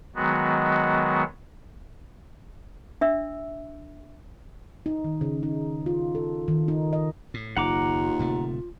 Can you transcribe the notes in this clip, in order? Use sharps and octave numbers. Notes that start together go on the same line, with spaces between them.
D#3 F#3 G#3 B3 F#4
D4 E5 E6
D#4
D#3
C#3
D#4
F4
A4
D#3
D#4
D#5
A2
F#1 D#2 F4 F#5 A#5 D6
D1 C3 A3